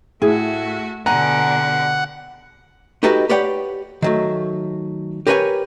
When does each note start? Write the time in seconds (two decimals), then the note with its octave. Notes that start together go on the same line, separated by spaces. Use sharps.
0.22 A2 A3 F#4 G#4
1.06 B2 D3 B4 F#5 G#5 A#5
3.03 D#4 F#4 G4 A4 B4 D#5
3.29 G4 B4 C#5 D5 F#5 G5
4.02 D#3 F#3 A3
5.27 G4 A#4 B4 C#5 F#5 G#5